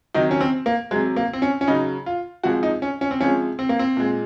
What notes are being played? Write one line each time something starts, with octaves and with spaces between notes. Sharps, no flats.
C3 D#3 F#3 D#4
C#4
C4
A#3
C3 F#3 G#3
A#3
C4
C#4
C#4
C#3 F#3 D#4
F4
C3 F3 G#3 F#4
D#4
C#4
C#4
C4
C3 F3 G#3 C#4
C4
A#3
C4
A#2 G#3